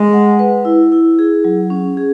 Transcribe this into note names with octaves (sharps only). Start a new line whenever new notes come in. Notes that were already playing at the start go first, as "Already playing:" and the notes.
Already playing: G#3
F#5
B4
E4
E4
G#4
F#3
C#4
G#4